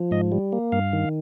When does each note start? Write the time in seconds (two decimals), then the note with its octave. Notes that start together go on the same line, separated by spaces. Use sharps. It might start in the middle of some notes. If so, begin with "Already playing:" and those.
Already playing: F3
0.11 G#2 D#5
0.32 G3
0.53 A#3
0.72 G2 F5
0.93 D#3